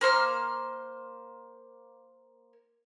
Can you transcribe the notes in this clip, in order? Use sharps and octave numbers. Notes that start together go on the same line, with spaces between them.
A#3 C5 C6 F6